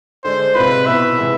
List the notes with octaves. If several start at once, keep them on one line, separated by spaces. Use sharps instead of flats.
D3 G#3 D4 C5
C3 G#3 C4 F4 B4
B2 B3 E4 E5
C3 E3 G#3 B3